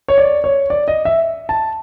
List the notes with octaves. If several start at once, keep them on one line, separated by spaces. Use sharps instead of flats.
C#5
D5
C#5
D5
D#5
E5
A5